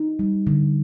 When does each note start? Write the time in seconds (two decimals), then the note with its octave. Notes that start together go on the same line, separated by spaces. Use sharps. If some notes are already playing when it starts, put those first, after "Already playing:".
Already playing: D#4
0.19 G3
0.47 D3